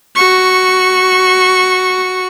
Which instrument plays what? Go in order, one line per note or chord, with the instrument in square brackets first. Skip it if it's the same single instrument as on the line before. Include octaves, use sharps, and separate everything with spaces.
[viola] F#4 C#6